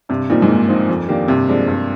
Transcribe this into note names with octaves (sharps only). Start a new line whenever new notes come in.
G2 C3
A#2 D#3 G3 C4 D#4
G#2
G2 A#2
F3 C4 D#4
F2
D#3 A#3 D4 G4
G2 C3
F3 G#3 D4
G2